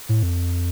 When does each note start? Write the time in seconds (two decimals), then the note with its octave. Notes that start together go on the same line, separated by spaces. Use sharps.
0.09 A2
0.23 F2